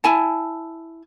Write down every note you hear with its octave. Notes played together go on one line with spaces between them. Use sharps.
E4 G#5 A5